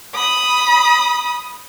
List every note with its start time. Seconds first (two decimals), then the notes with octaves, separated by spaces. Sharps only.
0.15 B5 D#6